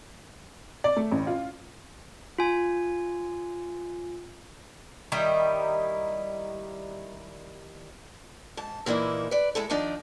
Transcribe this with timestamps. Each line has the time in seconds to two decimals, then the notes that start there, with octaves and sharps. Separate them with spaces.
0.84 D5
0.96 A3
1.12 A1
1.27 F4
2.38 F4 G#5
5.12 D#3 G3 D#4 E4
8.57 G#2 A5
8.86 A#2 E3 A#3 D#4 E4
9.31 B4 D5
9.55 G#3 E4 A4
9.70 D#3 F3 D4 D#4 D5